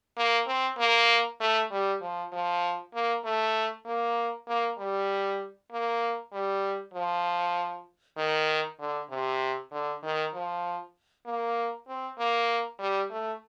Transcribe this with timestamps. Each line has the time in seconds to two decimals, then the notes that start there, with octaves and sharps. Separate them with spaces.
0.17 A#3
0.47 C4
0.78 A#3
1.40 A3
1.71 G3
2.01 F3
2.33 F3
2.94 A#3
3.25 A3
3.86 A#3
4.47 A#3
4.78 G3
5.71 A#3
6.33 G3
6.94 F3
8.17 D#3
8.79 D3
9.11 C3
9.72 D3
10.03 D#3
10.34 F3
11.26 A#3
11.88 C4
12.18 A#3
12.79 G3
13.10 A3